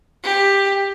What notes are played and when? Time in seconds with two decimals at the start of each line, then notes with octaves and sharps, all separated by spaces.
0.23 G4